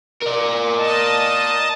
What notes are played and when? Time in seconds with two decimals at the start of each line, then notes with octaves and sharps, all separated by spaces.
0.22 A#4 D5
0.77 D#5 A5